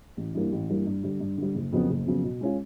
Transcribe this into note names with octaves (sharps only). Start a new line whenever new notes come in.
A1
G2 E3 G3 A#3
A1
G2 E3 G3 A#3
G2
D3 G3
G2
D3 G3
F#1
F2 C#3 F#3 B3
F#1
F2 C#3 F#3 B3
B2
G#3 C#4 F4